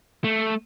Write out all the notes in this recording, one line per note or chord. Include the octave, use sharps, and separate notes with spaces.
A3